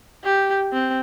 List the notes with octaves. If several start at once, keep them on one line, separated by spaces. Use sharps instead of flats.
G4
C4